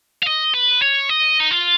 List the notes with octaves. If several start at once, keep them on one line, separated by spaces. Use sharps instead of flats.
F5
D#5
B4
C#5
D#5
D#4
F4